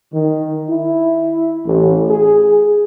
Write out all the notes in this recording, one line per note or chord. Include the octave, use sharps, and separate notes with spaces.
D#3
E4
A1
G#4